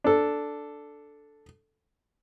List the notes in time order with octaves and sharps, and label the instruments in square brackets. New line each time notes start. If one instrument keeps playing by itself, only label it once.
[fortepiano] D4 A4